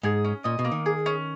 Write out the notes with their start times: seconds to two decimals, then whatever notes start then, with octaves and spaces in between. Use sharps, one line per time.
0.03 G#2 G#4
0.25 C#4
0.44 A#2 D#5
0.59 B2
0.64 A#3
0.72 D#3
0.86 G#4
1.06 C#4